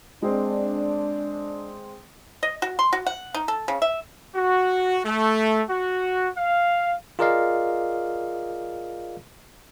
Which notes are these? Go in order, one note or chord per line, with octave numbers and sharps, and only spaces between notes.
G#3 C4 D4
D#5
F#4
C6
F#4
F#5
D#4
A4
C#3
E5
F#4
A3
F#4
F5
F4 G#4 A#4 D5 D#5 F5